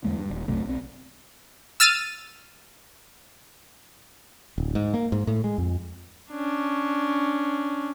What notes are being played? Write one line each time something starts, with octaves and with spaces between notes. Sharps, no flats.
E2 D3 G#3 A#3
G2
D#1
B1 F#2 C3 A3
B1 C4
E6 F6 A6 D#7
D1
G#2
A#3
G#2
A2
G#3
F2
C#4 D4